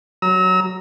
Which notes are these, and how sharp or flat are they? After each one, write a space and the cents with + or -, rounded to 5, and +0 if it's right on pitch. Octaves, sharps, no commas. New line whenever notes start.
F#3 +5 A#5 +0 E6 -35